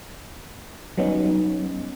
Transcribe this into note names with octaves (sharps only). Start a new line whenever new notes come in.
F#3 G3 B3 C#4 D#4